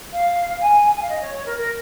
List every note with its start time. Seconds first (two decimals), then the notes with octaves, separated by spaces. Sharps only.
0.12 F5
0.61 G#5
0.94 G#5
1.02 F5
1.09 D#5
1.21 C#5
1.34 C#5
1.46 A#4
1.58 A#4